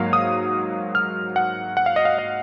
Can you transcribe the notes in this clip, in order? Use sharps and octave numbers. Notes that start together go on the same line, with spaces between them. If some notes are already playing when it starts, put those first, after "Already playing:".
Already playing: G#2 F#3 A#3 F5
D#6
F6
F#5
F#5
F5
D#5
F5
D#5